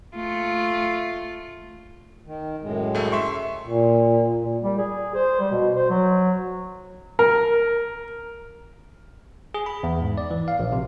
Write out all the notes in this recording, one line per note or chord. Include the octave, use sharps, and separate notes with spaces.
A3 F4
D#3
F#2 A2 G#3
C2 A3
E5 C6 C#6
A#2
A#2
G3
G#4
C5
G3
B2
C5
F#3
A#4
G#4
B5
E2
G#2
D5
E3
F5
A#1
C3